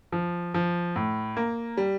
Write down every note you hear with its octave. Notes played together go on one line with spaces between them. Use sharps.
F3
F3
A2
A#3
G3